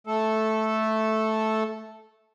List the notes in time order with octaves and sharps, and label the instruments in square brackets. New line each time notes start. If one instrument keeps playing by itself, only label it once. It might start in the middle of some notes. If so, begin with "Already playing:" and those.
[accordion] A3 A4